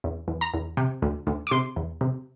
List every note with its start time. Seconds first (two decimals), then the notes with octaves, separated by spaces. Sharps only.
0.04 E2
0.28 E2
0.41 A#5
0.54 E2
0.77 C3
1.02 D2
1.27 D2
1.47 D6
1.51 C3 C6
1.76 E2
2.01 C3